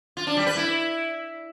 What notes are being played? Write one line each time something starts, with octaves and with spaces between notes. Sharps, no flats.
F4
D4
G3
B4
E4